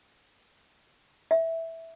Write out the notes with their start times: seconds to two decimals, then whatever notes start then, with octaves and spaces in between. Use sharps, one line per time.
1.31 E5